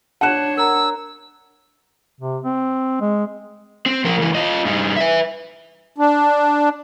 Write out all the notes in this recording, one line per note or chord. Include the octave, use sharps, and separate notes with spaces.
D4 C#5 F#5 A5 F#6 C#7 E7
A#4 A#5 E6
C3
C4
G#3
C4
F3 A#4
C#2 E3
F4 D#5
G2 D#4
B4 E5
D4